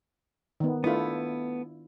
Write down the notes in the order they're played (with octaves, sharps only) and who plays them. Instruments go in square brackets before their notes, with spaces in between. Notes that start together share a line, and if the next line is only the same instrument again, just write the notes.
[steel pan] D#3 B3
[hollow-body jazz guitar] A3 B3 [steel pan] D4 E4 F4